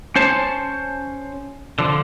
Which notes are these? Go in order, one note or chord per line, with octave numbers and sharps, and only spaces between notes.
C#4 C5 C#5 A5
D3 F3